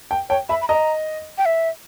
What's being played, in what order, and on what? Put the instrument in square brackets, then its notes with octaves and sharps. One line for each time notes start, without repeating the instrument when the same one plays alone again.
[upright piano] G5
[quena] C#5 [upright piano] G5
[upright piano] E5 [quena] B5
[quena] B5
[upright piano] D#5 [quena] A#5
[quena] G5
E5